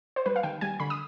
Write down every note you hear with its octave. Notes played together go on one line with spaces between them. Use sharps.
C5
G3 B4
F5
D#3 G5
G3 G#5
D3 B5
D#6